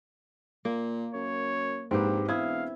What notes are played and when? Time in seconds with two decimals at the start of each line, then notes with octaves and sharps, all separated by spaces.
0.65 A#2 A#3
1.14 F#2 C#5
1.91 A#1 G#2 C4 G4 B4
2.29 E1 E4 F5 D#6 G#6